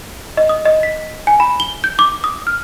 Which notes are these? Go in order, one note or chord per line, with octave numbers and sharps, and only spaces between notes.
D#5
D#6
D#5
B6
G#5
B5
G7
G6
D6
D#6
F6